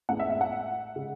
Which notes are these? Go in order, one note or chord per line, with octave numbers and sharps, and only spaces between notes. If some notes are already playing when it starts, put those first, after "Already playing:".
A1 A2 G#3 B3 F#5
E5
E5
F#5
C#3 G#3